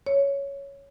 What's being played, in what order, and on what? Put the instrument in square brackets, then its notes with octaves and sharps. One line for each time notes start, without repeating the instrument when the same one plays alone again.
[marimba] C#5